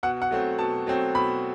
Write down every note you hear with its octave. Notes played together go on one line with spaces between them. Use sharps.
B2 F#5
F#5
F#3 A3 C4
B2 A5
F#3 A3 C4
B2 B5